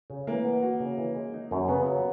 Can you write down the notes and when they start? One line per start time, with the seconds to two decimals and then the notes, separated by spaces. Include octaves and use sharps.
0.10 C#3
0.27 E3 A#3
0.45 B3
0.62 F#4
0.80 C#3
0.98 E3
1.16 G#3
1.34 D#4
1.51 F#2
1.68 C#3 B3
1.86 F#3